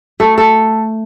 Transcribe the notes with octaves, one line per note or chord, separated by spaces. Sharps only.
A3 A4
A4